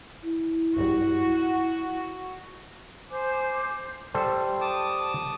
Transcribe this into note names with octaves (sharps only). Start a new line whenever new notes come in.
E4
B1 G2 G3 F#4
C5 G#5 D6
G3 A4 C5
A5 D6 D#6